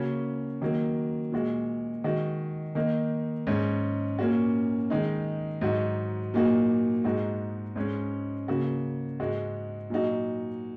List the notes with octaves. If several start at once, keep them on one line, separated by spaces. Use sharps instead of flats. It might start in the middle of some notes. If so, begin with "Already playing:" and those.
Already playing: C#3 A#3 C#4 F#4
D#3 F#3 A#3
A#2 G#3 F#4
D#3 G#3 F#4
D#3 A#3 D#4
G#2 G#3 C#4
A#2 A#3 C#4 F#4
D#3 G#3 D#4
G#2 F#3 D#4 F#4
A#2 F#3 A#3 D#4 F#4
G#2 G#3 D#4 F#4
G#2 G#3 C#4
C#3 A#3 F#4
G#2 G#3 F#4
A#2 F#3 D#4 F#4